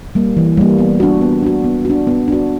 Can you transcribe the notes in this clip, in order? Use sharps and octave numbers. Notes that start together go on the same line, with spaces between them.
G3 A#3
E3
G3 A#3
B3
D4 F#4
B3
D4 F#4
B3
D4 F#4
B3
D4 F#4